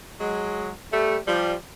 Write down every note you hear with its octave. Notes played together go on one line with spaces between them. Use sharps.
F#3 G#3
G3 A3
F3 G3